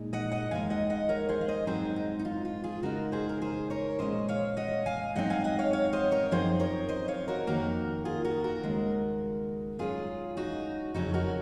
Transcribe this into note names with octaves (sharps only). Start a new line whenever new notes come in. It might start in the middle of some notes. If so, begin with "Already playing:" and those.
Already playing: A#2 G#3 D#4
D#5 F#5
D#5 F#5
D#2 D#3 G#3 F5 G#5
D#5 F#5
D#5 F#5
A#4 C#5
G#4 C5
F5
C5 D#5
G#2 F#3 C4 D#4 G#4 C5
D#4
D#4
F4
F4
F4 G#4
C#3 G#3 D#4 F#4 A#4
G#4 C5
A#4
G#4 C5
A#4 C#5
A#2 G#3 C#4 C5 D#5
C#5 F5
D#5 F#5
F5 G#5
G#2 F#3 C4 D#4 D#5 F#5
F5 G#5
D#5 F#5
C#5 F5
C#5 F5
C5 D#5
A#4 C#5
F#2 F3 C4 D#4 G#4 C5
A#4 C#5
C5 D#5
C#5 F5
F#4 A#4
F2 C3 D#3 A#3 F#4 A#4
F4 G#4
F#4 A#4
F#4 A#4
D#2 C#3 G#3
G#2 F#3 C#4 F4 G#4
D#4 F#4
F2 C#3 F#3 C#4 D#4 F#4
F#4 A#4